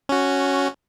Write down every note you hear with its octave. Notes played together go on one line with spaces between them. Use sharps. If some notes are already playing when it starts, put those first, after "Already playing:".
C#4 F#4